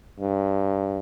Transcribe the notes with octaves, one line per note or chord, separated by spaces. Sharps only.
G2